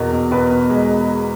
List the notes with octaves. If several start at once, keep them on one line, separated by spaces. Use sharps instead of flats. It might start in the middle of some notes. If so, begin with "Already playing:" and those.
Already playing: E2 B2 A#4
B2
B2 B4
B2
G#3